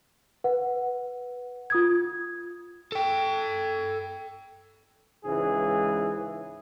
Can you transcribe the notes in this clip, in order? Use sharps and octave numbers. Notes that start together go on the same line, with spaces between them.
B4 F#5
F4 D#6 G#6
A4 G5
C#2 G#2 E3 G#4